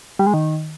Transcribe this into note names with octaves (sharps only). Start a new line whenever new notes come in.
G3
G#3
D#3